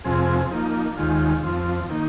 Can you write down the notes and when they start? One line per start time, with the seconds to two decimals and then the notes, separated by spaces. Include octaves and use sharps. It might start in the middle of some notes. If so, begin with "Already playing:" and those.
0.04 F2 C3 F3 C4 G#4
0.51 F3 A#3 D#4
0.97 D#2 D#3 G#3 F4
1.43 F2 F3 C4
1.89 D#3 A#3 D#4